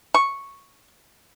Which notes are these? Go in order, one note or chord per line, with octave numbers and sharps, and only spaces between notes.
C#6